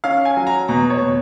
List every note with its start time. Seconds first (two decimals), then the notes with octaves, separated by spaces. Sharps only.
0.04 C#4 F5
0.25 G#5
0.37 F#3
0.47 A#5
0.68 B2 A#5
0.90 C#5
1.02 B2